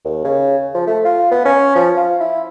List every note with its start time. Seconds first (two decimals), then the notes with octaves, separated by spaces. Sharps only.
0.05 D#2
0.24 C#3
0.74 F3
0.87 A3
1.05 F4
1.31 B3
1.45 C#4
1.75 F3
1.97 F4
2.20 E4